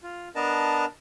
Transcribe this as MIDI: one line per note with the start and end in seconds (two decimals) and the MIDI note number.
0.03 0.28 65
0.35 0.85 59
0.35 0.85 62
0.35 0.85 70
0.35 0.85 75
0.35 0.85 81